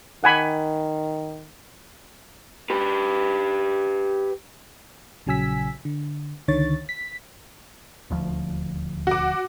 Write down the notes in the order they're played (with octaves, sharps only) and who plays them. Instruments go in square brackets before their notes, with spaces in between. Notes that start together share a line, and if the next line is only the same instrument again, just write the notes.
[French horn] D#3 [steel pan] F#5 G#5 B5
[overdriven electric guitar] G4 B4
[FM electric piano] A#1 C#3 F#3 G#5 E6 B6
D3
C#2 D3 D#3 C#5 A6
B6
[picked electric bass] D#1 D2 F3
[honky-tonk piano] F#4 D6